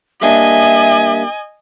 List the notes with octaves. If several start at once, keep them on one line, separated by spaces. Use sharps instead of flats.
G3 A#3 D4 D#5 E5 G#5